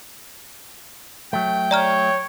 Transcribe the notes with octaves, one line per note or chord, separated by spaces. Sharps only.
F#3 A3 G5
C#5 D5 A#5 F6